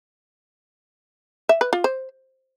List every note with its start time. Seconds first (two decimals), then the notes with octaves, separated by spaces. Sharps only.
1.49 E5
1.61 B4
1.73 F4
1.84 C5